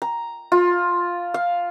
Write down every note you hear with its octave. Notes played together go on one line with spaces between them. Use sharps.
A#5
F4
F5